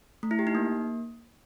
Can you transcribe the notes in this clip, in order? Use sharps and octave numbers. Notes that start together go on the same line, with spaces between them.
A3
E4
G4
D#4
A#3